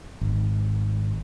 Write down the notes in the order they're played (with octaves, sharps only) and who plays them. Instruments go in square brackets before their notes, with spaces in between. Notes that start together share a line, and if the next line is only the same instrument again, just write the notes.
[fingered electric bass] G#1